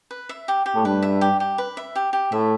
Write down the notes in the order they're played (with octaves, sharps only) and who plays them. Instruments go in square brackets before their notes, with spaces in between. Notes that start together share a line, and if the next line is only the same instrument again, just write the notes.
[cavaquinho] B4
E5
G4
G4
[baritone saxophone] A2
[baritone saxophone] G2 [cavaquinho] B4
[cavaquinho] E5
G4
G4
B4
E5
G4
G4
[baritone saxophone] A2 [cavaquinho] E5